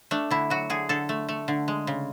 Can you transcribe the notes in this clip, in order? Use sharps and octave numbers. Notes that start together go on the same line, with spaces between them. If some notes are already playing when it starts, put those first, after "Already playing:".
A3 D4
D3 E4
F#3 F#4
D3 G#4
D3 A4
A3
A3
D3
G#3
C#3